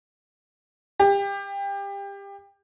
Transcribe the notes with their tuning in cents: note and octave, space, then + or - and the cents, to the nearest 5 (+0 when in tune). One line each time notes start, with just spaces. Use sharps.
G4 +25